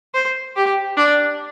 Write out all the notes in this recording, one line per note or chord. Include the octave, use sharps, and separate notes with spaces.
C5
G4
D4